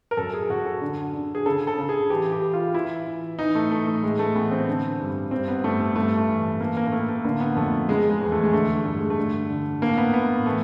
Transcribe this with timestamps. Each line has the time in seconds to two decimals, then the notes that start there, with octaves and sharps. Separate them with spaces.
0.11 A#4
0.17 F#2 A4
0.34 G#4
0.50 F#2 F#4
0.66 A4
0.81 D3
1.14 D3
1.35 G#4
1.46 C#3 A4
1.67 A4
1.78 C#3
1.89 G#4
2.10 E3 G4
2.32 G4
2.43 E3
2.53 F4
2.74 E3 E4
3.07 E3
3.39 E3 D#4
3.55 A3
3.71 E3 A3
3.87 A3
4.03 A2 G#3
4.19 A3
4.35 E3 B3
4.51 C4
4.67 D3
5.00 G2
5.31 G2 C4
5.48 B3
5.64 G2 A3
5.80 A3
5.96 G2 A3
6.17 A3
6.28 E3
6.60 E3 A#3
6.77 A#3
6.87 A#3
6.92 A2 A3
7.09 A3
7.25 D3 A#3
7.40 B3
7.56 F2 A3
7.89 C#3 G#3
8.10 G#3
8.21 E2
8.32 A3
8.43 G#3
8.53 D3 A3
8.85 G2 A3
8.97 G#3
9.10 A3
9.18 D3
9.50 D3
9.82 A2 A#3
9.97 B3
10.14 A2 B3
10.46 E3 A3